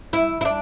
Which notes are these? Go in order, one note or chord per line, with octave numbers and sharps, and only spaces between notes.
E4
E4
D4